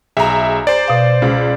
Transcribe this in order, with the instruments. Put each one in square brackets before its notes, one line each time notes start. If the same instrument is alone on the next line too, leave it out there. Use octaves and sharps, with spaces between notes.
[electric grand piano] B1 E5 [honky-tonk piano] G#4 A#5
[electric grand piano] C5 D5
[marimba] B2 F5
[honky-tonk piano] C#2